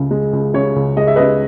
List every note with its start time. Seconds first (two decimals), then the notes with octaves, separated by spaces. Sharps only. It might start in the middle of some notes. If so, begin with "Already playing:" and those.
Already playing: C#2 C#3
0.11 G#3
0.33 C#2
0.54 C#3 C#5
0.76 C#2
0.96 G#3 D#5
1.07 E5
1.16 C#2 B4 D#5